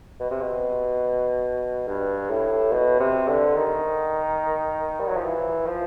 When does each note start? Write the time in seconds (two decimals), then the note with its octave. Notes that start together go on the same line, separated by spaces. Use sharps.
0.20 B2
0.31 C3
0.41 B2
1.88 G2
2.30 A2
2.72 B2
3.00 C3
3.28 D3
3.56 D#3
5.00 G3
5.08 F#3
5.17 F3
5.25 E3
5.67 F3